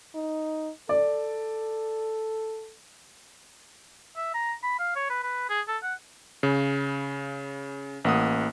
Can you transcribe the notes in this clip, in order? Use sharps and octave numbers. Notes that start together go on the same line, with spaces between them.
D#4
A4 D5
E5
A#5
B5
F5
C#5
B4
B4
G#4
A4
F#5
C#3
A1 A#3 F#5 D#6